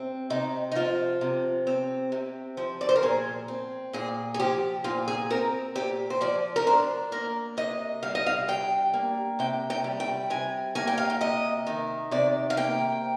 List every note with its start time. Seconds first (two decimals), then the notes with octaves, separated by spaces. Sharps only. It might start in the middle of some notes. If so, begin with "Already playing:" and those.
Already playing: C3 C4
0.30 C3 D#4
0.72 D#4
0.75 F3 F4
1.21 C3
1.67 C4
2.12 C3
2.57 F3
2.81 D5
2.89 C5
2.96 A#4
3.02 A#2 G#4
3.48 C4
3.93 A#2 G#4
4.34 G#4
4.39 F3 G4
4.84 A#2 F4
5.08 G#4
5.30 C4 A#4
5.75 A#2 G4
6.10 C5
6.21 F3 D5
6.56 A#4
6.67 D4 C5
7.12 A#3 A#4
7.57 C3 D#5
8.03 G3 F5
8.15 D#5
8.26 F5
8.48 D4 G5
8.94 A#3
9.39 C3 G5
9.70 G5
9.84 G3
10.00 G5
10.30 C3 G#5
10.75 A#3 G#5
10.87 G5
10.98 F5
11.10 G5
11.21 C3 D#5
11.67 D#3
12.11 C3 D5
12.50 F5
12.57 A#3 G5